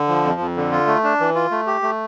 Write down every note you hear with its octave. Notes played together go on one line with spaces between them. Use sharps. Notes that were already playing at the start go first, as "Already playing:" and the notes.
Already playing: D3
F3
F2
F2
D3
F4
A3
D4
E3
F4
A3
G4
A3